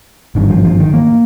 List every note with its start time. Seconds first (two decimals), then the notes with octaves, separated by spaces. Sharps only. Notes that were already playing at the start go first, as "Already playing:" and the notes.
0.35 G#1 G2 D#3
0.50 F3
0.64 F3
0.80 D#3
0.94 A#3